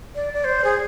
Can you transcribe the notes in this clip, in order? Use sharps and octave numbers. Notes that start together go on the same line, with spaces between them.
D5
D5
C5
G#4